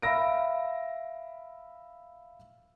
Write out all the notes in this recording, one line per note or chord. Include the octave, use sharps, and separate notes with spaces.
E5 F5 B5 E6 A#6 D7